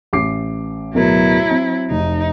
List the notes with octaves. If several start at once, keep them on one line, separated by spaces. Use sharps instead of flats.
A1 D6 C7
D1 B2 F#3 E4 A#4
C4
F1 D#4